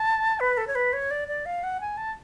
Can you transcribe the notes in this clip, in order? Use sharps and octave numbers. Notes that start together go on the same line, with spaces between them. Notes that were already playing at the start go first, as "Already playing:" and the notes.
Already playing: A5
B4
A4
C#5
B4
C#5
D5
D5
F5
F#5
G#5
A5